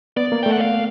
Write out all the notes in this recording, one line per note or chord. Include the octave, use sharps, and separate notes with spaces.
B3 D5
A#3
A3 G5
F#5
F5